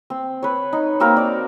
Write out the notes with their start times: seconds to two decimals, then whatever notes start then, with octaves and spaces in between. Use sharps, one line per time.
0.10 C4
0.43 B4 C#5
0.73 D#4
1.00 A#3 C4 F#4 A#4
1.16 D5